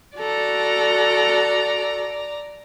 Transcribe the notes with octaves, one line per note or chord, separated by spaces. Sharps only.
F#4 A4 D5 A#5